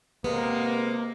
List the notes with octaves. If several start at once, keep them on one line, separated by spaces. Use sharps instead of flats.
C3 G#3 A#3 B3